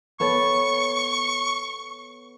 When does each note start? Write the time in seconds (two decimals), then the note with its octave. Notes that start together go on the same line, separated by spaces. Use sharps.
0.20 B3 A4 C#5 C#6